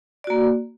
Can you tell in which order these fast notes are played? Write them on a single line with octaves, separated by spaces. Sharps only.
D5 F#4 A#3